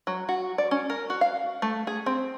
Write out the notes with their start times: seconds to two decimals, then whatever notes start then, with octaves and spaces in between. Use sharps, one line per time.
0.07 F#3
0.29 F#4
0.58 D5
0.71 C#4
0.90 A#4
1.10 F#4
1.21 F5
1.62 A3
1.87 G#4
2.06 C4